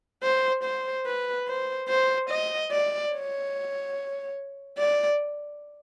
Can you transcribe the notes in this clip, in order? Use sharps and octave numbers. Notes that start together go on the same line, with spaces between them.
C5
C5
B4
C5
C5
D#5
D5
C#5
D5